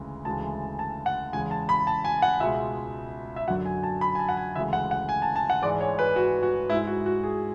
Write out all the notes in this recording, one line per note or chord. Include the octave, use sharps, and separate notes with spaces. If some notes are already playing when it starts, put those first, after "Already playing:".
Already playing: D2 C#3 E3 G#3
D2 C#3 E3 G#3 A5
A5
F#5
E2 C#3 G#3 G#5
A5
B5
A5
G#5
F#5
C#2 B2 G#3 E5
E5
F#2 D3 F#3 F#5
G#5
A5
B5
G#5
A5
F#5
G#5
D2 C#3 E3 G#3 E5
F#5
F#5
G#5
A5
A5
F#5
G#2 E3 G#3 D5
C#5
B4
F#4
F#4
G#2 G#3 E4
F#4
F#4
G#4